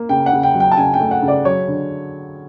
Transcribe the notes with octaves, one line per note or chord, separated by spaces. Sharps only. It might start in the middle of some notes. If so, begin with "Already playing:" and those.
Already playing: A#3
C#3 G5
F#5
C#3
G5
F#3
G5
A5
C#3 G#5
G5
A3
F#5
C#3
D5
F#3 C#5
D3